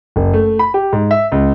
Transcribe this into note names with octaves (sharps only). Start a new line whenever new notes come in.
F#1
A3
B5
G4
G#2
E5
C#2